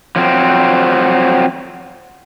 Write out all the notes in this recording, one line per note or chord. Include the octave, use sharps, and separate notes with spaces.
F3 F#3 C4